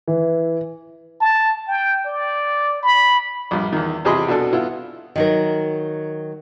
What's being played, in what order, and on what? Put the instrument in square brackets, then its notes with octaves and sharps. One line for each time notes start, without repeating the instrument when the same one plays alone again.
[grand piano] E3
[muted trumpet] A5
G5
D5
B5
[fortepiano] A#1 G2
E2 D#3
E2 C3 G#4 D#5 B5 C6
B2 D4 A4
B3 E4 F4
[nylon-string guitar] D#3 F#3 A#4